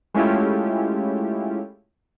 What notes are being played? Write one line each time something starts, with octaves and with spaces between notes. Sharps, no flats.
G#3 A3 C#4 E4 F4 G4